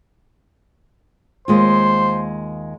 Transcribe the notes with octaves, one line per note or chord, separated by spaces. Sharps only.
D#2 G#3 F4 C5